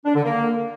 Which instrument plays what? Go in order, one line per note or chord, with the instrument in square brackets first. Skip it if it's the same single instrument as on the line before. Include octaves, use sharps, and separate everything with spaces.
[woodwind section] D4
D3
A#3